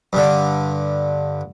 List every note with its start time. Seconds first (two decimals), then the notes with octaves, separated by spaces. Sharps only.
0.13 G2 D3